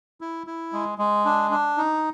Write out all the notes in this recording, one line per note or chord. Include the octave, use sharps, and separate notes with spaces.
E4
E4
G#3
G#3
D4
D4
D#4